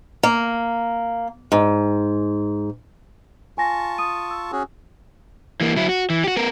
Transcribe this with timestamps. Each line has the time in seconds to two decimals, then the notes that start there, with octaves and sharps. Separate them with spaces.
0.23 A#3
1.52 G#2
3.58 F4 G#5 A5 C#6 A#6
3.98 D#6 D#7
4.30 E6
4.52 C#4 F#4 G#4
5.61 E3 A#3
5.77 F#3 E4
5.89 F#4
6.10 E3
6.24 F#4 G4
6.37 B3 A#4